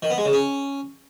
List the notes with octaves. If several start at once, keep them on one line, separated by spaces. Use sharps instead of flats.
D#3
B3
G#3
C#3
C#4